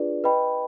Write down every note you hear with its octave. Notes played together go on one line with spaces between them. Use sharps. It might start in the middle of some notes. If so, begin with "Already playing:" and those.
Already playing: D4 F4 G#4 B4 D5
B4 D#5 G5 B5